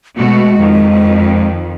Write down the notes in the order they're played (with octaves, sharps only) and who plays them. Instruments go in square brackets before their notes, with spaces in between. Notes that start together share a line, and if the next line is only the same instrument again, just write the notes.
[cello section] B2 A3 F#4 [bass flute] G#3
[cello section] F2 D#3